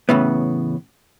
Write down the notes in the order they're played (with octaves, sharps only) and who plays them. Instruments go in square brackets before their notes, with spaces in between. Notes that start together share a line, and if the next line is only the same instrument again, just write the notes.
[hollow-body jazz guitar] A2 C#3 E3 B3